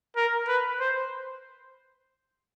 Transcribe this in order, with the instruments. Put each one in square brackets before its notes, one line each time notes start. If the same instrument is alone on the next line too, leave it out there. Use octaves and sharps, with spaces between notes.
[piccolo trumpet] A#4
B4
C5